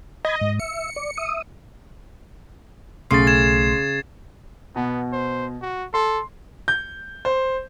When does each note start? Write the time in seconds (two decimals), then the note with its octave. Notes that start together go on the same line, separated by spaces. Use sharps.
0.25 D#5 B5 G#6
0.41 G#2
0.60 E5 C#7
0.96 D5
1.17 E5 D#6
3.11 B1 C#3 A3 C6 A6 C7
3.27 G#6 E7
4.76 B2 B3
5.12 C5
5.62 F#4
5.94 A4 C6
6.68 G6
7.25 C5